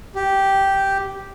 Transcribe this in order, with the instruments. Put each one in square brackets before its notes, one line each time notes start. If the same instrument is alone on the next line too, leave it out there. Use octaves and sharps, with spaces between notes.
[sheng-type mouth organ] G4